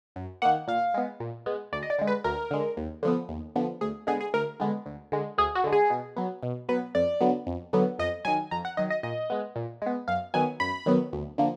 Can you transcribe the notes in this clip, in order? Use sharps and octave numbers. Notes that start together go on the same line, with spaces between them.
F#2
D#3 A#3 F#5
A#2 F5
G#3 B3
A#2
G#3 B3
D2 D5
D#5
D5
D3 G#3
B4
D2 A#4
D3 G#3
D#2
D3 F3 B3
D#2
D3 F3 B3
D2 G#4
D3 G#3 B3 G#4
G#4
D2 A#4
D3 G#3 B3
D2
D3 G#3
D2 G#4
F#4
D3 G#3
G#4
B2
F#3 B3
B2
F#3 B3 B4
F2 D5
D3 F#3 B3
F2
D3 F#3 B3
F2 D#5
D#3 F#3 G#5
F2 A#5
F#5
D#3 F#3 D#5
D#5
A#2 D#5
G#3 B3
A#2
G#3 B3
F#2 F5
D#3 F#3 B3 G#5
F#2 B5
D#3 F#3 B3
D2
D3 F3 A#3